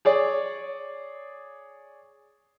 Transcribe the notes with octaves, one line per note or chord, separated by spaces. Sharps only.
G#4 C#5 D5